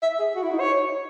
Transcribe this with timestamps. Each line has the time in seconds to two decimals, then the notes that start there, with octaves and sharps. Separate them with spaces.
0.03 E5
0.19 G#4
0.36 F#4
0.43 E4
0.52 D#4
0.60 C#5